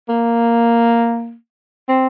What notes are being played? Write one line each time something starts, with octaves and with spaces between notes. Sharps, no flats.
A#3
C4